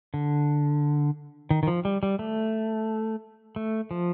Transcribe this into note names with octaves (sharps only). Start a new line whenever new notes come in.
D3
D#3
D#3
F3
G3
G3
A3
A3
F3